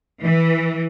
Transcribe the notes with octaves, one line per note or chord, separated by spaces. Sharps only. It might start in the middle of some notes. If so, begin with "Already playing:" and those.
E3